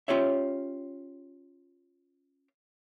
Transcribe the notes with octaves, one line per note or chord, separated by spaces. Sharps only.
C#4 F4 G4 C#5 E5